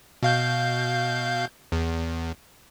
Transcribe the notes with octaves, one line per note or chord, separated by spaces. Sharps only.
B2 F5 G6
E2